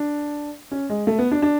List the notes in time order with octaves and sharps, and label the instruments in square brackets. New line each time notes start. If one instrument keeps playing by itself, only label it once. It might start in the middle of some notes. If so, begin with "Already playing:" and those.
Already playing: [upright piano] D4
C#4
G#3
A3
B3
D4
D4